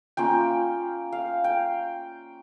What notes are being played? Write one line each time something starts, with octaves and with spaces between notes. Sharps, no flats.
A#3 C#4 F4 G5
F5
G5